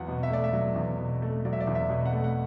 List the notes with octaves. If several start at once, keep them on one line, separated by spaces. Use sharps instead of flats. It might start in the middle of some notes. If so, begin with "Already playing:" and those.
Already playing: E2 F#3 F#5
B2
E5
A3 D5
E5
F#3
E2
B2
A3
F#3 D5
E5
D5
E2
E5
B2
F#5
A3
F#5